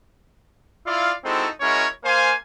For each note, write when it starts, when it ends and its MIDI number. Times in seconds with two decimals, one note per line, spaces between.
0.86 1.12 64
0.86 1.12 65
0.86 1.12 74
0.86 1.12 77
1.24 1.47 56
1.24 1.47 60
1.24 1.47 63
1.24 1.47 64
1.24 1.47 66
1.24 1.47 69
1.61 1.87 56
1.61 1.87 61
1.61 1.87 64
1.61 1.87 66
1.61 1.87 70
1.61 1.87 73
2.04 2.34 58
2.04 2.34 72
2.04 2.34 77
2.04 2.34 80